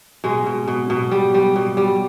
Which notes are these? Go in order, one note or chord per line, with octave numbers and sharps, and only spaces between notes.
B2 G#3
B2
B2
B2
G3
G3
B2
G3